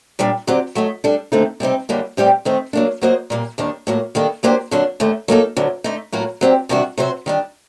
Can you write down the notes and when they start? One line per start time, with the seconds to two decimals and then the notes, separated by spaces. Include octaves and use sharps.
0.19 A#2 G3 D4
0.47 D3 F#3 C4 G4 D5
0.75 F#3 A3 D#4
1.04 G3 D4 A4
1.32 D#2 D3 A3 C4 D#4
1.60 C3 G3 C4 D#4
1.89 F#2 D3 G3 A#3 D#4
2.17 A2 G3 C4 G4 D5
2.45 D#3 A3 C4 D#4
2.73 F#3 A#3 D4
3.02 F#3 A#3 F#4 C5 D#5
3.30 A#2 G3 A#3
3.58 D#2 D#3 G3 D4
3.87 A2 F#3 A#3
4.15 D#3 G3 A#3 D4 A4
4.43 F#3 A#3 D4 G4 C5
4.71 D3 F#3 A#3 D4
5.00 D#2 D3 A3
5.28 F#3 A#3 D#4 A4
5.57 D2 D3 F#3
5.84 D3 A3 D#4
6.12 A2 F#3 A#3 F#4 A#4
6.41 F#3 C4 G4 D5
6.69 C3 D#3 G3 D4 F#4
6.98 C3 F#3 C4 F#4 C5
7.26 D#3 G3 D4